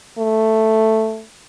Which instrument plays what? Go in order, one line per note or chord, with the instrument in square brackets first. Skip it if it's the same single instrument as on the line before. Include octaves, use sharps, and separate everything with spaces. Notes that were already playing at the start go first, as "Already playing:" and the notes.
[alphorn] A3